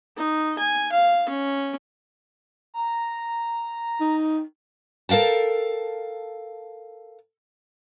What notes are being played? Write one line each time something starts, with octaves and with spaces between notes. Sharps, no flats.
D#4
G#5
F5
C#4
A#5
D#4
A4 A#4 F5 G5 A5